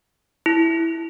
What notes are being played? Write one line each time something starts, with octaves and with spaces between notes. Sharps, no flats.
E4